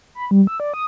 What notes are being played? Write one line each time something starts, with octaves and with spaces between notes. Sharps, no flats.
B5
G3
E6
D5
D#6